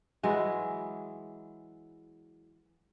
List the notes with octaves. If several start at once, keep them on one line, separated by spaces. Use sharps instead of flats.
E3 F#3 G#3 E4